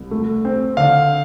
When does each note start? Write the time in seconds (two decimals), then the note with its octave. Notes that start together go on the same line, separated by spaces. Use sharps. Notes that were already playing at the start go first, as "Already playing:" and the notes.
Already playing: C2
0.11 A3
0.45 C4
0.77 D3 F5